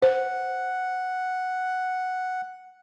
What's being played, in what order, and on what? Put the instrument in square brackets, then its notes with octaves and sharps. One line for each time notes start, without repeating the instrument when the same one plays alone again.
[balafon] C5 [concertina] F#5